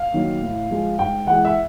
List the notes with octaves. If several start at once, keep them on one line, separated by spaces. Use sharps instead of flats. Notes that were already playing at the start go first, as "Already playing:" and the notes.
Already playing: F5
D#3 F#3 A#3
A2
F3 G#3
G#2 G5
E3 G#3 F#5
E5